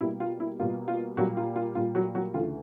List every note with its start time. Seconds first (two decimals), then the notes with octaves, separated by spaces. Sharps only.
0.01 B2 G3 A#3 E4
0.20 F4
0.40 E4
0.59 B2 G3 A#3 F4
0.88 F4
1.17 A#2 F#3 G3 A#3 F#4
1.37 F4
1.56 F4
1.75 A#2 G3 A#3 F4
1.95 F#3 F#4
2.15 F#3 F#4
2.34 D2 C#3 E3 A3 F4